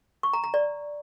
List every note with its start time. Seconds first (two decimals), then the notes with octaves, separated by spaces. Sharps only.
0.23 C#6
0.33 A#5
0.44 A#5
0.54 D5